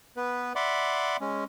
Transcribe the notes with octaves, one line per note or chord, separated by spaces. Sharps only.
B3 B4
D5 E5 F#5 B5 C6 D6
G#3 C#4